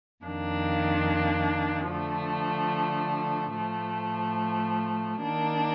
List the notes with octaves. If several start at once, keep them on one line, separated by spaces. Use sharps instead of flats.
F2 D#3 A#3 D4
D3 F3 A3
A2 F3 A3
D#3 A#3 D4